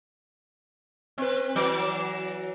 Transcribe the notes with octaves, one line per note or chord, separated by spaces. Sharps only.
C4 B4
E3 F#3 D5